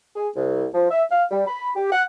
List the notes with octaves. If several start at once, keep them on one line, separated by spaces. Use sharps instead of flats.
G#4
C2
F3
E5
F5
G3
B5
G4
F#5